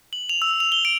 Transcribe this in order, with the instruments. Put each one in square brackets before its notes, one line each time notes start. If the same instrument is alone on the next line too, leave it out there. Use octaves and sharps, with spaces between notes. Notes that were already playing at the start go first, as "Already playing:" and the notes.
[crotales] F#7
F7
E6
F7
G7
D7